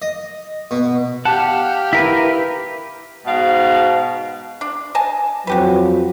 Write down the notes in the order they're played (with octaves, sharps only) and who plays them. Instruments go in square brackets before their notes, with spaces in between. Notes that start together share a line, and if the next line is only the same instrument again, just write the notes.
[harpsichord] D#5
B2
[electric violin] G4 F5 [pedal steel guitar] F#5 [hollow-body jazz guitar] A5
[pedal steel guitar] E4 A#4 B4 [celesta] B6
[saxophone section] G#2 B2 F5
[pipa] D4
D#5 G#5 A5
[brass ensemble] F2 F3 F#3 [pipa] F#4 G4 B4